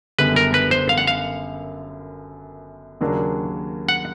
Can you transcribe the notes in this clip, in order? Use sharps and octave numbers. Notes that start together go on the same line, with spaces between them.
F#1 F#2 D3 G3 B3 B4
A#4
B4
C5
F5
F#5
F5
D#2 C#3 F#3 A#3 D4
F#5